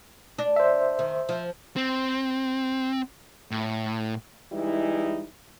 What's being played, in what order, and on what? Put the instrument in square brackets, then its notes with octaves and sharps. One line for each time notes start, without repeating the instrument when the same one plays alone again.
[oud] D4
[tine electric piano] C5 E5
[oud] D#3
F3
[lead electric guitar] C4
A2
[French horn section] E3 G3 G#3 D#4 E4